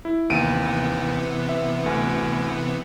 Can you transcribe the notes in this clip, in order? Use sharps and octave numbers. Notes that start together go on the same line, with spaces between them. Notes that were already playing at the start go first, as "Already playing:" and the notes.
E4
D#2 C3 E3 B3 D7 D#7
E5
D2